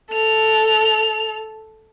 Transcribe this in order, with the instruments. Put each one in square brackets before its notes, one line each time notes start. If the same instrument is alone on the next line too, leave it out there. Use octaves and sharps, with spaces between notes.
[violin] A4 F7